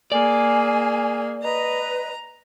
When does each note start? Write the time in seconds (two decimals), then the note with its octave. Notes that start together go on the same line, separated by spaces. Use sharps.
0.12 A#3 G#4 D5 G#5
1.43 B4 D#5 A#5